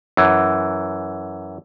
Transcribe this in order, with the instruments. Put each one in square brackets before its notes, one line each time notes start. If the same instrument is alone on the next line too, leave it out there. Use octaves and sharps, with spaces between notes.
[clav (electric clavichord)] F#2 E3